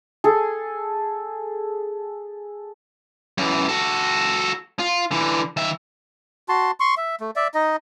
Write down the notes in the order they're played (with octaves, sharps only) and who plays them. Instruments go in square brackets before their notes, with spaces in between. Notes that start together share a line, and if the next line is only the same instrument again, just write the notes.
[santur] G#4 A4
[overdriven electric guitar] F#2 E3
F#4 A4
F4
D3 E3
D#3 E5
[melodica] F#4 A5 C6
C6 C#6
E5
A3
D5 E5
D#4 D#5